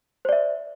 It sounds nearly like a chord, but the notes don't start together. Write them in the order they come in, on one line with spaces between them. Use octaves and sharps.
C5 D5 E5